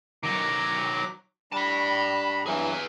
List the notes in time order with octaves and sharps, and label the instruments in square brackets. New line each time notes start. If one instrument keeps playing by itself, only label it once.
[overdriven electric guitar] D#3 F#3 [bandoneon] A#5 D6
[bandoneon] G3 D4 [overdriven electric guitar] A5 B5
[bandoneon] G2 E3 F#3 [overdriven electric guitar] G#4 B4